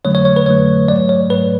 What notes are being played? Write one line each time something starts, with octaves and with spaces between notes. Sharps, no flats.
F2 D3 F#3 A3 C#5
C#5
C#5
B4
F2 D3 F#3 A3 C#5
G#2 F#3 A3 D5
C#5
G#2 F#3 A3 B4